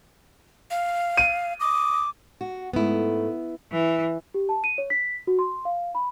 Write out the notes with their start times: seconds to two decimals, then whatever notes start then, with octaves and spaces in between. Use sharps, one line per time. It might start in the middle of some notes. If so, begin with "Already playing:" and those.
0.71 F5
1.17 D#7
1.60 D6 D#6
2.41 F#4
2.73 G#2 A3 B3 E4
3.72 E3
4.34 G4
4.49 A5
4.64 D#7
4.78 C#5
4.90 B6
5.27 F#4
5.39 C6
5.65 F5
5.95 B5